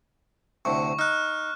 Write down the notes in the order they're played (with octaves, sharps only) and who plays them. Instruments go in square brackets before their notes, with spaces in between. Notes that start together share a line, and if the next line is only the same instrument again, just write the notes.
[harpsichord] D2 A2 C3 [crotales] C#6
[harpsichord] D#4 [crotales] F6 F#6